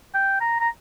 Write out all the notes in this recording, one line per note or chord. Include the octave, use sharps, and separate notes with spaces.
G5
A#5
A#5